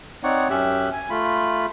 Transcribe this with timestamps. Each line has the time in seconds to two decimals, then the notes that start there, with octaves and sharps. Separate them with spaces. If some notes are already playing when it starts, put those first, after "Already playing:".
0.23 C4 D#4 C#5 D5 F#5
0.50 F#2 C#4 G4 E5 F#6
0.93 G#5
1.10 A3 F4 B5